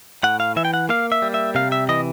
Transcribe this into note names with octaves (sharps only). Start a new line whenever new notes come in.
A2 F#5
F5
E3 E5
G5
F#5
A#3 F5
E5
G3
E5
C3 F5
E5
E3 D#5